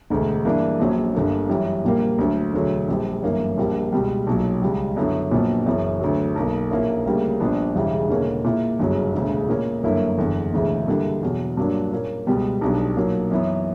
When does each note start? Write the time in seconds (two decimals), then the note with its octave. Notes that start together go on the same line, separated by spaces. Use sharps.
0.10 E1 D2 D3
0.45 G2 E3 A#3 D4
0.79 A#1 A#2 F#3 C#4
1.14 G1 G2 D3 A#3
1.49 F#2 E3 G3
1.84 A#1 A#2 G3 A#3
2.18 D2 D3 F#3
2.53 E1 D2 D3 F#3
2.88 A#1 A#2 G3
3.23 G1 F#2 E3 A#3 C#4
3.58 A#1 A#2 G3 A#3
3.92 C#2 B2 G3
4.27 B1 A#2 F#3
4.62 C#2 C#3 G3
4.96 F#2 D3 F#3 B3 E4
5.31 A#1 A#2 F#3 B3
5.66 F#1 F#2 E3 B3
6.01 D2 D3 F#3
6.36 B1 B2 A#3
6.71 A#1 A#2 A#3 C#4 E4
7.06 D2 C#3 G3 A#3 C#4
7.40 A#1 A#2 G3 B3 D4
7.75 E1 E2 C#3 E3 G3
8.10 E1 E2 D3 A#3 C#4
8.44 A#2 A#3 E4
8.80 G1 F#2 C#3 F#3 B3
9.13 E1 D2 C#3
9.48 A#2 A#3 C#4
9.83 G1 F#2 D3 A#3 E4
10.18 F#1 E2 D3
10.53 E1 D2 C#3 E3
10.87 G2 D3 G3 A#3 E4
11.22 E2 B2 F#3
11.57 G2 F#3 A#3 D4
11.93 A#2 A#3 C#4
12.27 C#2 B2 G3 B3
12.61 B1 B2 G3 B3 D4
12.96 B1 A#2 F#3 A#3
13.31 F#2 E3 B3